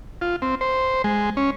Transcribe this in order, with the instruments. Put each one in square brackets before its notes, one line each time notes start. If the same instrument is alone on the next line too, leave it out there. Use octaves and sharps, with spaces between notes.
[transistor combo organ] F4
C4
C5
G#3
C#4